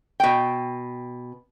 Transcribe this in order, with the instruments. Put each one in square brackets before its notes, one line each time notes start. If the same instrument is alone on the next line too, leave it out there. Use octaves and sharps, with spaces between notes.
[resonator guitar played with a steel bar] B2 G5